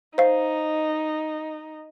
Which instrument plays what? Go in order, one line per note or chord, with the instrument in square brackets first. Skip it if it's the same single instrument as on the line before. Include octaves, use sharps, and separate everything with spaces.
[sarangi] D#4 [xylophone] C5 F5